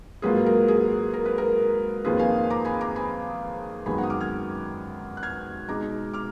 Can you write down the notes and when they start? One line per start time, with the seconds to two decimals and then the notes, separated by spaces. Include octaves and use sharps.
0.22 G#2 F#3 A#3 F4 G#4 B4
0.46 A#4
0.68 G#4
1.14 A#4
1.26 B4
1.38 A#4
2.05 F2 D#3 A#3 F4 G#4 B4
2.19 F5 G#5
2.50 A#5 D6
2.65 G#5 B5
2.81 A#5 D6
2.96 G#5 B5
3.86 F#2 D#3 G#3 B3 G#5 B5
3.98 F#5 A#5
4.03 D#6
4.10 D6 F6
4.21 F6 G#6
5.17 F#6
5.23 F6 G#6
5.68 B2 G#3 D#4 A#5 D6
6.13 D6 F6